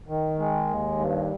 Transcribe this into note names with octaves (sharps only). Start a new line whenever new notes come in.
D#3
G#3
D#2
G2